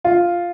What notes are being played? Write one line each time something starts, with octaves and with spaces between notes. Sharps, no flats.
F4